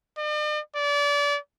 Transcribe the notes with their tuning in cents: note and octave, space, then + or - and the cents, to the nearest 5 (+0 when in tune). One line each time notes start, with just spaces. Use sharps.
D5 +45
D5 -30